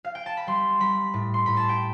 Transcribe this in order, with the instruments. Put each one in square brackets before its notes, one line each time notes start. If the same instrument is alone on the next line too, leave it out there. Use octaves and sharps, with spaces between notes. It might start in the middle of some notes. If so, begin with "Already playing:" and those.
[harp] F5
G5
A5
B5
G3 C6
G3 B5
A2
C6
A2 B5
A5
G5